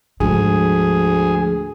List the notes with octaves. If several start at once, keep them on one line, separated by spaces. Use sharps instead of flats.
D2 G#2 F3 G#4